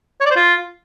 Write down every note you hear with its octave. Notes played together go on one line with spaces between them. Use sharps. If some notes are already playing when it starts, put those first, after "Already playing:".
C#5
D5
C5
F4